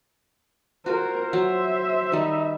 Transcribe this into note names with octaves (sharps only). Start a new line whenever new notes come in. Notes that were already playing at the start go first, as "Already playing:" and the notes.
F4 F#4 A#4 C5
F#3 E5
D#3 G3 D#4